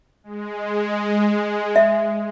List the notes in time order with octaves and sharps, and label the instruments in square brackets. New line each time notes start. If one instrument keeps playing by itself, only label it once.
[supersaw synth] G#3
[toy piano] E5